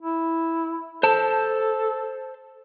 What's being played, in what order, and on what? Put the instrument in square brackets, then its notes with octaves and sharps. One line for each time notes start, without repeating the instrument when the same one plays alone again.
[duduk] E4
[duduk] A4 [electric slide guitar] C5 A5